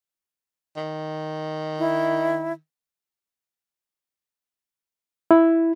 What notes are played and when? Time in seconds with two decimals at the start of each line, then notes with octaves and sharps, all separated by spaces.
0.76 D#3
1.79 E4
5.31 E4